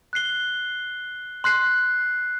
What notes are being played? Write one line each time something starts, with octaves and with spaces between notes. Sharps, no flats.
F#6 C7 G7
C6 F#6 C7